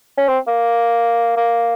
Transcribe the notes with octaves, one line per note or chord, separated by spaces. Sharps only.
C#4
C4
A#3
A#3